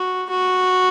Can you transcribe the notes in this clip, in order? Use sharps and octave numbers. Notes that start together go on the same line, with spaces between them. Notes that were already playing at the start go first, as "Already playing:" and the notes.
Already playing: F#4
F#4